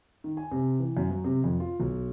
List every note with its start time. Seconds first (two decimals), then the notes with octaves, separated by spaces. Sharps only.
0.24 D#3
0.37 G#5
0.52 C3
0.80 E3
0.97 F#2
1.11 F#3
1.24 C3
1.44 F2
1.60 F4
1.80 B1